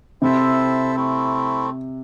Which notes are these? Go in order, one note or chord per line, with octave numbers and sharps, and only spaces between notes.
C3 C4 E4 A4 C5 E5
A3 C4 E4